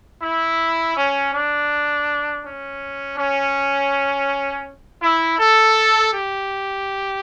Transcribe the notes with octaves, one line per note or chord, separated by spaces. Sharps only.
E4
C#4
D4
C#4
C#4
E4
A4
G4